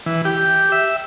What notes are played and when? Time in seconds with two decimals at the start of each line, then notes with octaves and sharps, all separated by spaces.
0.06 E3
0.25 G4
0.72 E5